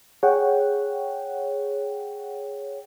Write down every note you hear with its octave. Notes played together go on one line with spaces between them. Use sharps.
G#4 C#5 F#5 G5